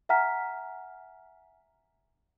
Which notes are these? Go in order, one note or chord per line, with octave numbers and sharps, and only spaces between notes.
E5 F#5 G#5 A#5 F6 B6